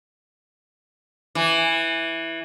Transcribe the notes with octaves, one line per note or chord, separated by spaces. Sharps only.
E3